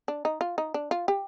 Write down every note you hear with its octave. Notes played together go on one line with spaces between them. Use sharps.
D4
D#4
F4
D#4
D4
F4
G4